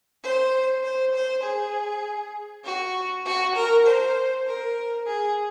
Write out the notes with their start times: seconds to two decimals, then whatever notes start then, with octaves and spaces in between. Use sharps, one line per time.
0.22 C5
0.82 C5
1.14 C5
1.43 G#4
2.64 F#4
3.25 F#4
3.55 A#4
3.85 C5
4.46 A#4
5.06 G#4